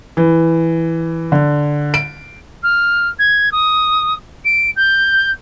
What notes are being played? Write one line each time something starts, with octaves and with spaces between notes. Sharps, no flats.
E3
D3
D7
F6
G#6
D#6
D7
G6